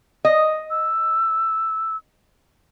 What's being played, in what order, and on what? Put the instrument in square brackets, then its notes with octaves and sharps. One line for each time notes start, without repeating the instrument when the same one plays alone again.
[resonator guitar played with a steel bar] D#5
[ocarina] E6